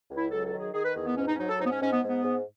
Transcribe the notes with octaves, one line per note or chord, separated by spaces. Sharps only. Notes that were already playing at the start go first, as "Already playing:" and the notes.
C#2
E4
F#3 A4
A4
D#3
G#4
D#3 G#4
B4
E2 G#4
B3
G#2 C#4
D#4
C#4
F#3 D#4
A4
G#2 D#4
B3
C#4
G#2 C#4
B3
G#2
B3
G#2